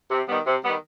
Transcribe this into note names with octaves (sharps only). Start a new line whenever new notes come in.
C3
D#3 G3 B3
C3
D#3 G3 B3